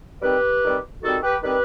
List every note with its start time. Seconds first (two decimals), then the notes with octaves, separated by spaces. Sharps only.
0.22 D#3 G3 C4 G4 B4
0.63 D#3 G3 C4
1.03 D#3 G3 C4 F#4 A4
1.23 G4 B4
1.42 D#3 G3 C4 G4 B4